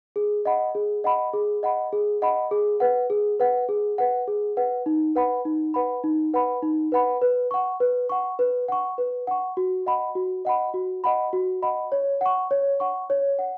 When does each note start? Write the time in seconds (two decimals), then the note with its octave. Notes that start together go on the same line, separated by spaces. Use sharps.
0.16 G#4
0.45 D#5 F#5 B5
0.75 G#4
1.04 D#5 F#5 B5
1.33 G#4
1.63 D#5 F#5 B5
1.92 G#4
2.22 D#5 F#5 B5
2.51 G#4
2.80 B4 F#5
3.10 G#4
3.40 B4 F#5
3.69 G#4
3.98 B4 F#5
4.28 G#4
4.57 B4 F#5
4.86 D#4
5.16 B4 F#5 B5
5.45 D#4
5.74 B4 F#5 B5
6.04 D#4
6.34 B4 F#5 B5
6.62 D#4
6.92 B4 F#5 B5
7.22 B4
7.51 F#5 C#6
7.80 B4
8.09 F#5 C#6
8.39 B4
8.68 F#5 C#6
8.98 B4
9.27 F#5 C#6
9.57 F#4
9.86 D#5 F#5 B5
10.15 F#4
10.45 D#5 F#5 B5
10.74 F#4
11.04 D#5 F#5 B5
11.33 F#4
11.62 D#5 F#5 B5
11.92 C#5
12.21 F#5 C#6
12.51 C#5
12.80 F#5 C#6
13.10 C#5
13.39 F#5